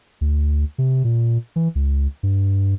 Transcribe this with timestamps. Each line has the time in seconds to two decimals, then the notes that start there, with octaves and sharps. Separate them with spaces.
0.21 D2
0.78 C3
1.04 A#2
1.56 E3
1.75 C#2
2.23 G2